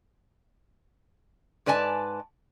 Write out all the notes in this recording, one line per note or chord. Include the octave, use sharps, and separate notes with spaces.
G#2 B4 D5 G#5 A5